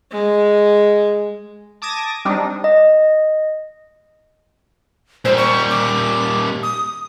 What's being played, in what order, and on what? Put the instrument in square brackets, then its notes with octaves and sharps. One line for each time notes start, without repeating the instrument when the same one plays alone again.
[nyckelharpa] G#3
[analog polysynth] A5 D6 D#6 G#6 A#6
G3 C4 D4 D#4
[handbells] D#5
[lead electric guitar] A#2 G3 [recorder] C5
[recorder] C#6
D6
D#6